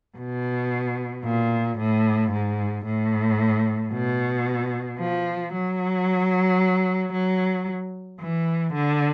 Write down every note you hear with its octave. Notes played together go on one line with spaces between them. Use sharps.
B2
A#2
A2
G#2
A2
B2
F3
F#3
F#3
E3
D3